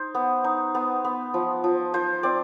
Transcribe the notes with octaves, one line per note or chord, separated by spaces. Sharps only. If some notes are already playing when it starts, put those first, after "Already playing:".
Already playing: D#4 C5
B3
D#4
B3
B3
F3
F3
F3 C5
C4 D5